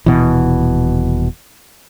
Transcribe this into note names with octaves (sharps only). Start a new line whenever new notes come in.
D#1 B2 E3